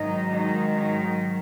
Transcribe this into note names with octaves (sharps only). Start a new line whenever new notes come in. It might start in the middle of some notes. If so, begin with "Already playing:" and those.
Already playing: G#2 D#3 F#3 D#4
D#4
D#4